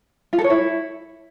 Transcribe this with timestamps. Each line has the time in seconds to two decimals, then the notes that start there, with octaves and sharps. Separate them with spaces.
0.33 F4
0.38 A4
0.44 C#5
0.50 E4